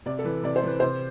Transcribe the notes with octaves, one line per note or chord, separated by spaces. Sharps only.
C3 D5
A4
E3 B4
C3 D5
C5
E3 B4
C3 C5